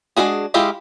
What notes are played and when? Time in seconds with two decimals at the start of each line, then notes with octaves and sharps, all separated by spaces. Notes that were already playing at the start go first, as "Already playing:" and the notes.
0.17 G#3 A3 D4 F#4 G#4
0.54 G#3 E4 F4 G4 G#4